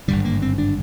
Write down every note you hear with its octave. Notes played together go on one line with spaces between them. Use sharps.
G#1 G2 D3 G3
A#3
C4
D4